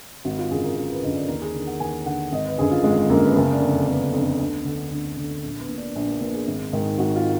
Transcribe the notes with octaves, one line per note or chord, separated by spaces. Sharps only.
G#1 F#4
F4
F#2 D3 G#4
A#4
G#1 A#4
B4
F#2 D3 D#5
D5
D#2 A#4
G#4
D3
F#5
D#2 G#5
D3 F#5
G#1 D#5
B4
F#2 D3 G#4
F4
G#1 G#3
F#2 D3 A#3
B3
F#1 A#3
D4
F2 D3
F#1 B3
F2 D3
D2
D3
D2
D3
A#1
B3
A#2
D4
A#1
A#3
A#2 B3
G#4
G#1
G#2 D#3
G#1 F#4
F4